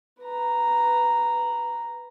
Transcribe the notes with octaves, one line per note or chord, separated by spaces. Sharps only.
B4 A#5